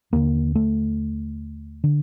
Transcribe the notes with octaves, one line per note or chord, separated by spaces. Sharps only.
D#2 D3 A#3
A3
D3